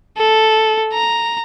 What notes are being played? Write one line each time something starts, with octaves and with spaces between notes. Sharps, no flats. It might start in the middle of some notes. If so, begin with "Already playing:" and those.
A4
A#5